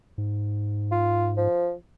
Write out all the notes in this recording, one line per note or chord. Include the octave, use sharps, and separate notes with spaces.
G#2
F4
F3